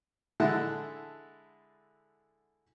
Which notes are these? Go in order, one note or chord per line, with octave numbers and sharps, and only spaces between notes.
D3 G#3 E4 F#5 A5